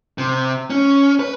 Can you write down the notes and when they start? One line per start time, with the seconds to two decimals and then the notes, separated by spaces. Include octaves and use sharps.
0.18 C3
0.70 C#4
1.20 B4